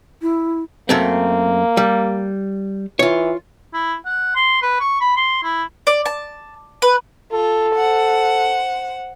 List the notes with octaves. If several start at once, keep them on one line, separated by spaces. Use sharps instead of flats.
E4
F#2 A3 A#3 C4
G3
E3 F4 C#5
E4
F#5
C6
B4
C#6
B5
C6
E4
D5
A5
B4
F4 A4
C5 F#5